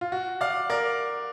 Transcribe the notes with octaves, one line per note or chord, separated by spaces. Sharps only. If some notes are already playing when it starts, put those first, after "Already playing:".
F4
F#4
D5 F5
A#4 D5